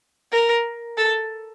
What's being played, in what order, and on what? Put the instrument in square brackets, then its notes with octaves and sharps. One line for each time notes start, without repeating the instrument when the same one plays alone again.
[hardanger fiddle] A#4
A4